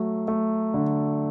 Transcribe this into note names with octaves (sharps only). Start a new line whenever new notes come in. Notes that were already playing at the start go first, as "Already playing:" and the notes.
Already playing: F#3 A3
A3
D3